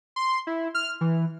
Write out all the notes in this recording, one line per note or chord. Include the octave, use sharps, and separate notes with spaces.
C6
E4
F6
E3